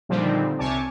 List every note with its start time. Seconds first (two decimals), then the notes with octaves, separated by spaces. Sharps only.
0.09 A#2 D3 D#3 F3 G3 C4
0.59 C2 C3 C#5 G#5 A5 D6